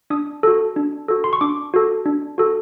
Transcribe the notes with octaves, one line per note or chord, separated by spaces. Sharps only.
D4 D#6
F#4 A4
D4
F#4 A4
C6
C#6
D4 D6
F#4 A4
D4
F#4 A4